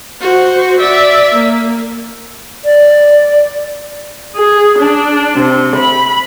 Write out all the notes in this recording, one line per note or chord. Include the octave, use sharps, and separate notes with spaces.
F#4 C5
D5 E5
A#3
D5
G#4
D4
C3
B5